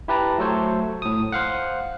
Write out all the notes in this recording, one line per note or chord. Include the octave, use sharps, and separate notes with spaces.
E4 G4 B4 A5 A#5
F#3 A3 A4 C5 C#5
A2 D#6
C5 F5 F#5